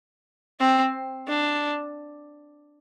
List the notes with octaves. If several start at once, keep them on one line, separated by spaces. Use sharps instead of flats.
C4
D4